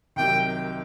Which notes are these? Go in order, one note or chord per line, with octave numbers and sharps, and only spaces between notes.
C2 C3 D#3 F#3 G5